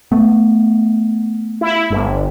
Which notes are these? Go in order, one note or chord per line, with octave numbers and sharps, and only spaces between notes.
A3 B3
E4
G1